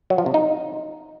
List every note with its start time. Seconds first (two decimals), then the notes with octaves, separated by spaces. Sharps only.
0.10 F#3
0.18 F3
0.26 C3
0.34 D#4